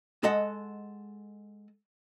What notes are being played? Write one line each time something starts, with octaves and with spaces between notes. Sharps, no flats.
G#3 A4 D#5 F#5